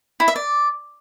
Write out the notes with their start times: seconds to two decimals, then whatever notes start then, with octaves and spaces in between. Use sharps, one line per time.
0.20 E4
0.28 E5
0.36 D5